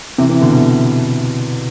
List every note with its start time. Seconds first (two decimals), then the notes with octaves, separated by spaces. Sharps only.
0.18 C3 E3
0.29 C3 E3
0.41 B2 D3
0.52 B2 D3